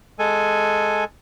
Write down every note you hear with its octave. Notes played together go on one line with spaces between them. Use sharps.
G#3 A4 G#5